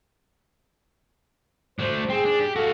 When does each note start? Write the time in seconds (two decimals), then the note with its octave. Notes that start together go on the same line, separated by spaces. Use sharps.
1.79 A3 D4 C5
2.10 C4 G#4
2.25 D4
2.39 G4
2.56 F#4 A4 F5